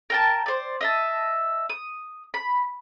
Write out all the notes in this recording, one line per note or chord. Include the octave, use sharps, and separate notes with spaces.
A#4 G5 A5
C5 D5
D#5 E5 A5
D#6
B5